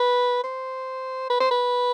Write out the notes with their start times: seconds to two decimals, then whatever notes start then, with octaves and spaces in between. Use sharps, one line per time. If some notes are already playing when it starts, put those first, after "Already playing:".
Already playing: B4
0.44 C5
1.30 B4
1.40 C5
1.51 B4